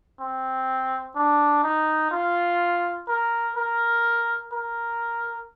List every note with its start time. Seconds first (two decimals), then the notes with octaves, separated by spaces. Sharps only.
0.20 C4
1.16 D4
1.63 D#4
2.11 F4
3.08 A#4
3.56 A#4
4.52 A#4